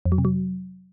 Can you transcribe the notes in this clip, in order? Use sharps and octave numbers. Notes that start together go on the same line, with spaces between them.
F2
F#3
C3
F#3